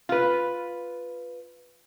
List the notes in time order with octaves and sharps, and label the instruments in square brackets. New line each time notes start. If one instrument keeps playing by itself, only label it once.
[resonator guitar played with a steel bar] F4 B4